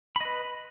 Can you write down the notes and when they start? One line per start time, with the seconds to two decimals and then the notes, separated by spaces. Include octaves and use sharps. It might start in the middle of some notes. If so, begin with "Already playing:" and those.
0.16 B5
0.21 D#5
0.25 B4